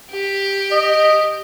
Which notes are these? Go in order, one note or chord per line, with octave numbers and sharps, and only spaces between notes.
G4
D#5